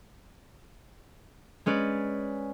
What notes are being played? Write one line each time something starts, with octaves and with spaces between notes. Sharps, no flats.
G#3 C#4 B4 D5